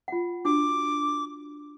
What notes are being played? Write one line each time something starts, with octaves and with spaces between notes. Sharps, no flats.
F4 F#5
D4 F#4 D6